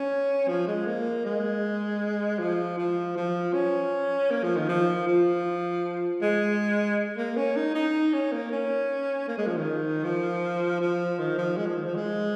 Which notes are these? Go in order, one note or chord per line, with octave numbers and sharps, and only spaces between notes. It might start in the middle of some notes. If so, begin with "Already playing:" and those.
Already playing: C#4
F3
G#3
A#3
G#3
F3
F3
F3
C#4
A#3
F3
D#3
F3
F3
G#3
A#3
C#4
D#4
D#4
C#4
A#3
C#4
A#3
G#3
F3
D#3
F3
F3
D#3
F3
G#3
F3
D#3
F3
G#3